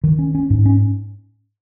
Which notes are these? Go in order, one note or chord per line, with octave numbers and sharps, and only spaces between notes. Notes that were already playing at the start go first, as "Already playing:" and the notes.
D#3
C#4
C#4
G#2
C#4